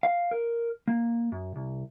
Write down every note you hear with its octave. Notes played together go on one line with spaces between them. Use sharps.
F5
A#4
A#3
F#2
C2